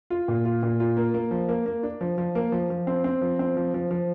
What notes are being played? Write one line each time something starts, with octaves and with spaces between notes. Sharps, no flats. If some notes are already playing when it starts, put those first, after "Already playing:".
F4
A#2
F4
A#2
F4
A#3
A#3
F3
A#3
A#3
D4
F3
F3
A#3
F3
F3
C4
C4
F3
C4
F3
F3
F3